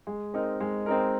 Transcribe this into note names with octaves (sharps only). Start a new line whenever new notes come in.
G#3
C4 D#4 A#4
G#3
C4 D#4 A#4